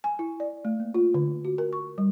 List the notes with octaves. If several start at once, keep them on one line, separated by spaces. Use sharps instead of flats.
G#5
E4
D5
A3
A#3
F4
D3
F#4
A#4
C#6
G3